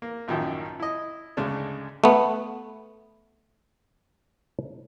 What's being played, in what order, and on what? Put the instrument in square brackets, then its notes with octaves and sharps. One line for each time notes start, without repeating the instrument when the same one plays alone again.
[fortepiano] A#3
A1 F#2 A#2 D#3 F3
E4 D#5
D2 G#2 C#3 G#3 A3 D4
[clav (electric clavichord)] A3 B3